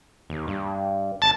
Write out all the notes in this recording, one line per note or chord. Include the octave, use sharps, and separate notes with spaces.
D#2
G2
G#1 A5